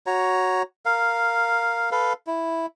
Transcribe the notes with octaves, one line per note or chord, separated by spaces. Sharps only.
F#4 C#5 A#5
A#4 F5
A4 B4 F5
E4